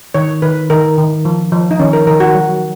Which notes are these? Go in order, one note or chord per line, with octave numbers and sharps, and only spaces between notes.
D#3 C#5
D#3 B4
D#3 A#4
D#3
F3
F3
D#4
D#3 C#4
A#4
D#3 A#4
F#4
F#3